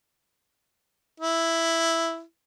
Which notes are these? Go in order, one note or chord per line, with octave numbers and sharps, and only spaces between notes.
E4